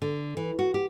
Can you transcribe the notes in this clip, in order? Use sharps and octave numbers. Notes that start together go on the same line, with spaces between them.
D3
E3
F#4
G4